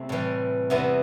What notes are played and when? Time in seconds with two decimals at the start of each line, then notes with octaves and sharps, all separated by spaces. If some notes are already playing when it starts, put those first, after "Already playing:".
Already playing: C3 A3 C4 E4
0.09 A2 E3 G3
0.70 E2 C3 E3 B3 E4